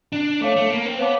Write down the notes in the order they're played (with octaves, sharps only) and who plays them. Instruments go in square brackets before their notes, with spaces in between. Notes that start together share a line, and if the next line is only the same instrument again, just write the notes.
[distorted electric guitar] D4
[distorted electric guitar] A3 [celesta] C#5 F5 A5 D6
[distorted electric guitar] A3
A#3
C4
[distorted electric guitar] B3 [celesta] C#5 F5 A5 D6